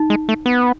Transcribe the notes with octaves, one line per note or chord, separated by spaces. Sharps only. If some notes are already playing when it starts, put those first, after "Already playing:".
Already playing: D#4
G#3
A3
B3